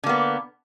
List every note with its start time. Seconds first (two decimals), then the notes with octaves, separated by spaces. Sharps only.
0.04 D3
0.06 A#3
0.09 B3